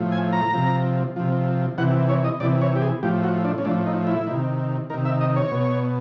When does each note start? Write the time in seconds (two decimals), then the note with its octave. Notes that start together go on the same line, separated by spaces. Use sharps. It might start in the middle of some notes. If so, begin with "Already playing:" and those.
Already playing: A2 F3
0.12 G#5
0.32 A#5
0.53 C3 F3
1.16 C3 F3
1.78 C3 E3 F#5
2.09 C#5
2.24 D#5
2.40 C3 E3 D5
2.61 C#5
2.76 G4
2.82 G#4
3.03 A2 F3 G4
3.23 F#4
3.44 D4
3.58 C#4
3.65 A2 F3 D4
3.86 D#4
4.07 E4
4.27 C3 D#3
4.90 D#3 A#4
4.94 C3
5.05 E5
5.21 D#5
5.36 C#5
5.51 B2